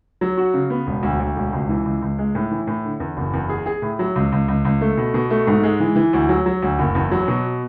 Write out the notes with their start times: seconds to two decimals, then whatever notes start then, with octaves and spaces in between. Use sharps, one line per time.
0.21 F#3
0.37 F#4
0.54 C#3
0.70 B3
0.87 E1
1.03 D2
1.19 D2
1.36 E1
1.53 C#2
1.69 E3
1.85 C#2
2.02 C#2
2.18 G#3
2.35 A2
2.51 E3
2.67 A2
2.85 D3
3.00 E2
3.17 F#1
3.33 E2
3.49 G#4
3.66 G#4
3.82 A2
3.99 F#3
4.16 C#2
4.32 C#2
4.48 C#2
4.65 C#2
4.81 A3
4.97 B2
5.14 B2
5.30 A3
5.47 G#2
5.63 G#3
5.80 E3
5.96 E3
6.13 D2
6.29 F#3
6.46 F#3
6.62 D2
6.79 F#1
6.95 E2
7.11 F#3
7.28 B2